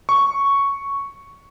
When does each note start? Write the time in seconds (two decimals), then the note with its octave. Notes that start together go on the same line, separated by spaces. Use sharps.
0.09 C#6